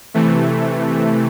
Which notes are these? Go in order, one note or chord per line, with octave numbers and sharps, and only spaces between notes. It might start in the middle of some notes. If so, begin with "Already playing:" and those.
C3 E3 A3